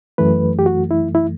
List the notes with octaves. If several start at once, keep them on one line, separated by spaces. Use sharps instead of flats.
F#2 E3 A3 B4
G4
F#4
E4
E4